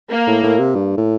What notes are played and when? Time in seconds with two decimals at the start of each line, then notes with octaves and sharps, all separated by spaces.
0.11 A#3
0.27 A2
0.43 A2
0.59 C3
0.75 G2
0.97 A2